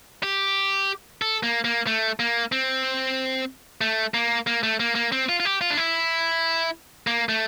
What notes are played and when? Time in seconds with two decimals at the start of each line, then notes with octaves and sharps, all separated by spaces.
0.23 G4
1.22 A4
1.43 A#3
1.65 A#3
1.87 A3
2.20 A#3
2.52 C4
3.81 A3
4.14 A#3
4.47 A#3
4.63 A3
4.80 A#3
4.95 A#3
5.12 C4
5.29 F4
5.40 F4
5.45 G4
5.61 F4
5.70 D4
5.77 E4
7.07 A#3
7.29 A3